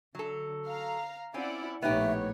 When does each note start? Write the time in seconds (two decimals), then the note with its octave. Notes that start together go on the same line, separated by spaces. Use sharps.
0.15 D3 F#3 A4
0.66 F5 A#5
1.34 C4 C#4 E4 D5 F#5
1.82 A#1 A2 B3 D#4 G4 C#5 E5